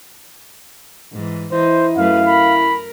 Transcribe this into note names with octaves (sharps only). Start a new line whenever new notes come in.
G#2 E3
E3 D#4 E4 C5
F#2 A3 B4 F5
A#4 B5